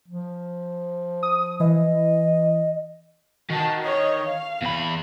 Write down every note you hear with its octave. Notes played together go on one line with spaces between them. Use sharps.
F3
D#6
E3 D#5
D#3 F#4 A5
C#5 D#5
F5
E2 B5